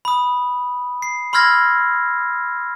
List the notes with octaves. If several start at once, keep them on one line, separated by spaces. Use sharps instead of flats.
B5 D#6
C7
B5 C6 E6 F6 G#6 A#6